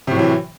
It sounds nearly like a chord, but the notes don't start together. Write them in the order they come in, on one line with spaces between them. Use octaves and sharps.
C3 A2 F#3 E3